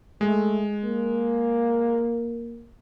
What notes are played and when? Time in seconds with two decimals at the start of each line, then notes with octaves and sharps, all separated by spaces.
0.21 G#3 A3
0.83 A#3